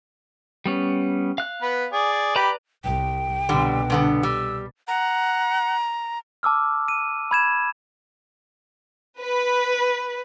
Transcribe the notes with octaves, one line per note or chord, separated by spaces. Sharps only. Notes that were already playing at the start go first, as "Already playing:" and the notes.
G3 B3 C#4
F5 F#6
B3 B4
G#4 D5
G4 B4 D5 A#5 B5
C2 G5
C2 B2 D3 G3
G2 D3 B3
G3 E6
F#5 A#5
A5 D6 E6 F6
D#7
B5 G#6 E7
B4